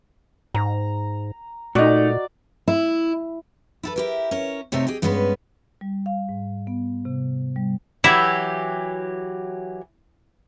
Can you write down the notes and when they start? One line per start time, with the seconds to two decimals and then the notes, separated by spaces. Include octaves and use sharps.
0.54 G#2 A#5
1.75 A#2 A3 D#4 F#4 D5 D#5
2.68 E4
3.83 E4 A4 B4
3.96 E4 G4 A#4
4.31 C#4 A#4 C#5
4.72 C3 A3 D#4 G4 C#5
4.87 G4 G#4 D#5
5.02 G2 G#3 B3 C#4 A#4 B4
5.81 G3
6.06 F5
6.29 G#2
6.67 B3
7.05 C3
7.56 G3
8.04 E3 F#3 E4 G4